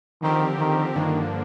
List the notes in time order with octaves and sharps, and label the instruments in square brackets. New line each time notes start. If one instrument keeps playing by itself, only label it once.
[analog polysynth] D3 F3 C4 G4 A#4 [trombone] D#3
[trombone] D#3
[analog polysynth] G2 D3 F3 A#3 D4 [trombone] D#3